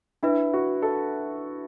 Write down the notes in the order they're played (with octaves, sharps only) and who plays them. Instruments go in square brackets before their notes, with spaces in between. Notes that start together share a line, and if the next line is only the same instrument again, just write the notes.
[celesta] D4 B4 E5 [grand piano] E4
[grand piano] F#4
A4